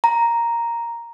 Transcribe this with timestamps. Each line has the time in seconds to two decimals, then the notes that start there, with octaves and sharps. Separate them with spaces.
0.04 A#5